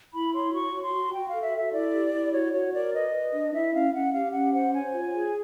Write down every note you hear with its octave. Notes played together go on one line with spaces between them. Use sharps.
E4 B5
C#5 C6
F#4 C#6
F#4
C6
F#4
F#4 G5
F5
A4
E5
A4 E5
E4 D5
G4
E4
F#4 C#5
F#4 C#5
A#4 D5
B4 D#5
B4
D4
E4 E5
C#4 F5
C#4 F#5
G4 F5
C#4 F#5
C5 F#5
C#5 G#5
F4
G#4